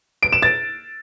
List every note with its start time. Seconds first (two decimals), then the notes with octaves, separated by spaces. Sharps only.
0.23 D7
0.32 E7
0.42 A6